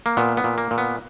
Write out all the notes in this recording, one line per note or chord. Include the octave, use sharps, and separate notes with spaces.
A#3
A#2 B3
B3
A#2
A#3
A#2
B3